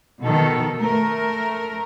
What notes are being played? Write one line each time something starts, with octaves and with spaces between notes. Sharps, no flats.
B2 D#3 A4
A3 A#4